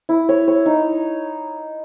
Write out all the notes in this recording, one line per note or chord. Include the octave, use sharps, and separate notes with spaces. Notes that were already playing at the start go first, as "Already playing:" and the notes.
E4
C#5
C#5
D#4